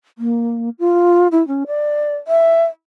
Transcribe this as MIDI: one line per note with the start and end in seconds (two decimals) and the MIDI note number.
0.18 0.69 58
0.79 1.28 65
1.32 1.45 64
1.47 1.64 61
1.67 2.16 74
2.28 2.65 76